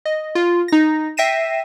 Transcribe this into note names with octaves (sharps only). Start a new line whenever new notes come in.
D#5
F4
D#4 A#6
E5 G5 A#6 C7 D#7 E7